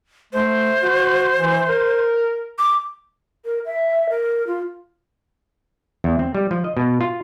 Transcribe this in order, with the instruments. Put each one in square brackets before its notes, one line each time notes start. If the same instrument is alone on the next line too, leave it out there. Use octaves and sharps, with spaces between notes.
[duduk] A3 [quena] C5
[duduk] F#4
E3
A#4
[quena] D6
[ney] A#4
E5
A#4
F4
[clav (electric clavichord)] E2
C4
G3
F3
D#5
B2
F4